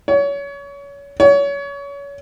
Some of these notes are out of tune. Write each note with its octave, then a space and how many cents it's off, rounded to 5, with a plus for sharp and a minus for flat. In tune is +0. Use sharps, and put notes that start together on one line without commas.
C#5 +30
C#5 +30